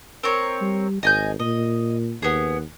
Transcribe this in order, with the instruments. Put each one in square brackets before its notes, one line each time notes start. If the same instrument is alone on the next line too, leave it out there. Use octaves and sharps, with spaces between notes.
[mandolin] C4 A#4 C#5
[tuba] G3
[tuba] G#1 [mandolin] D#5 G#5 G6
[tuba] A#2 [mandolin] D#5
[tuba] D#2 [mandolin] B3 G#4